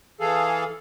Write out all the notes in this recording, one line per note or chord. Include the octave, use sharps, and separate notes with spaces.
E3 G#4 A4 F5